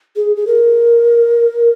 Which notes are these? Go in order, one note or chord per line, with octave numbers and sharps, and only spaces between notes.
G#4
G#4
A#4